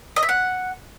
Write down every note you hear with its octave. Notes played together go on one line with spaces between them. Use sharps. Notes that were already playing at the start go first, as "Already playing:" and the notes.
D#5
E5
F#5